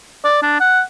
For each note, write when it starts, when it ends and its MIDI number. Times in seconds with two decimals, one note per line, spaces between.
0.25 0.37 74
0.42 0.57 62
0.60 0.81 78